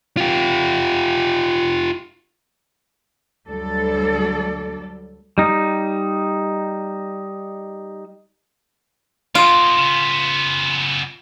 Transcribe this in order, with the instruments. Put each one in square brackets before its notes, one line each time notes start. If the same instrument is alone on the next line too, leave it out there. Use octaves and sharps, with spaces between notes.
[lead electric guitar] F4 G4
[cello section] D2 F#3 G3 A4 D5
[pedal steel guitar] G3 D#4
[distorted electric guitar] B3 D#4 [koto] F4 [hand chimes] C6 F6 D7
[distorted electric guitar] C#3 B3